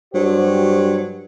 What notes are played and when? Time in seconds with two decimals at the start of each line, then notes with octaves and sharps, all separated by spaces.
0.14 G2 F#3 F#4 G4 C5